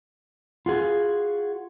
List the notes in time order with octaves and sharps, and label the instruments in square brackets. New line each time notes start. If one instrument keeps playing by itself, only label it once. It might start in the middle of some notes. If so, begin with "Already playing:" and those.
[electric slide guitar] F4 F#4 G#4